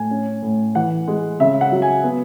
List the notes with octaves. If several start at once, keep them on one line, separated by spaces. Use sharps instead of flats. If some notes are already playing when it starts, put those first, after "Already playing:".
Already playing: A2 G#5
C#4
A2
E3 F#5
G#3
C#3 E5
F#5
F#3
G#5
B3